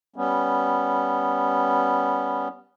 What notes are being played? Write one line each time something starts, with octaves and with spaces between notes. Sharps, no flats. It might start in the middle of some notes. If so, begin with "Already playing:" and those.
G3 B3 C#4